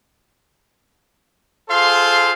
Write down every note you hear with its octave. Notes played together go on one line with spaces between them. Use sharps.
F4 G#4 A4 C5 F5 C6